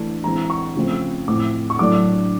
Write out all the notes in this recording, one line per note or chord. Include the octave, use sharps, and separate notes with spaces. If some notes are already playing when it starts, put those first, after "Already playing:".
Already playing: E3 A3 D4
E3 G#3 C4 A#5
C#6
C#3 F3 A3 C4
A2 F3 A3 C4 D6
C#6
A2 F#3 A3 D4 D6